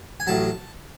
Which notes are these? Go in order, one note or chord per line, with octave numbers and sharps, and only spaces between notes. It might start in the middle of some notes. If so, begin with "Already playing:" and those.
G#5
A1 A2 F#3 A5